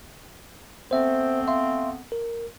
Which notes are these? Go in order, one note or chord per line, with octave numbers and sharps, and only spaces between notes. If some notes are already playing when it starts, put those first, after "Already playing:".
A3 B3 C4 C5 E5
E5 F5 C6
A#4